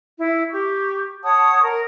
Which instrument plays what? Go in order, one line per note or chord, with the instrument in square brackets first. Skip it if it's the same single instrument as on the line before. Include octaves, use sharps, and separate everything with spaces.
[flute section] E4
G4 C#6
C#5 F#5 A5 D#6
A#4